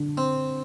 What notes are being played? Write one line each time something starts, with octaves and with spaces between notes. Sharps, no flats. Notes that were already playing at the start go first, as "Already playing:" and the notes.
Already playing: D3
C4